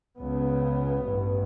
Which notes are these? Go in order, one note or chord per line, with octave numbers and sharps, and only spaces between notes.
C#2 C#3 B3
A1 G2